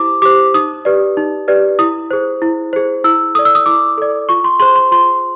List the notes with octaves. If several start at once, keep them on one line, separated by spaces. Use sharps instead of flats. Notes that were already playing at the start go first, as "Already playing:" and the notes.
Already playing: E4 G4 C5 D6
G4 C5 D6
D#4 D#6
G4 B4 D5
D#4
G4 B4 D5
E4 D#6
G#4 C5
E4
G#4 C5
E4 E6
A4 D5 D#6
E6
D#6
E4 D6
A4 D5
F4 C#6
C6
G#4 C5 C6
C6
F4 C6